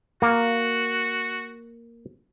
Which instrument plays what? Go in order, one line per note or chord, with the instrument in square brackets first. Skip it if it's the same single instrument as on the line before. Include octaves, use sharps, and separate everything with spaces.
[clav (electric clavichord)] A#3 [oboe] F#4